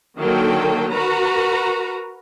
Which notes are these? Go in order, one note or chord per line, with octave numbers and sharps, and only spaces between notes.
D3 D#3 F#3 A#3 A4 G5
F#4 A#4 B4 A#5